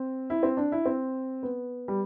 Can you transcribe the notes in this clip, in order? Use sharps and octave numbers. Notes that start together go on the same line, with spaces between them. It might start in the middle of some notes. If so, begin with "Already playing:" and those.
Already playing: C4
E4
C4
D4
E4
C4
B3
G3